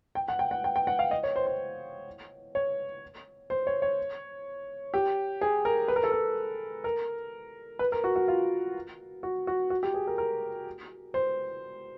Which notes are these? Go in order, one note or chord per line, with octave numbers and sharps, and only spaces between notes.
G5
F#5
G5
F#5
G5
G5
F#5
F5
D#5
C#5
C5
C5
C#5
C5
C#5
C#5
G4
G#4
A#4
B4
A#4
A4
A#4
A#4
B4
A#4
F#4
F#4
F4
F#4
F#4
F#4
G4
G#4
A#4
A#4
C5